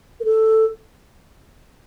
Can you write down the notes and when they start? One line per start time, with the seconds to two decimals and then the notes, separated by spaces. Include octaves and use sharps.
0.20 A#4
0.24 A4